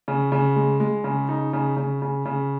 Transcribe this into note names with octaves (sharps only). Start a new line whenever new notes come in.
C#3
C#3
G#3
G#3
C#3
D#4
C#3
C#3
C#3
C#3